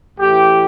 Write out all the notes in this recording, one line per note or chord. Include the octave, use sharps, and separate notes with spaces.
A2 E3 G4